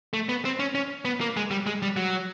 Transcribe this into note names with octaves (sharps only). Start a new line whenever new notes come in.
A3
B3
C4
C#4
C#4
B3
A#3
G#3
G3
G#3
G3
F#3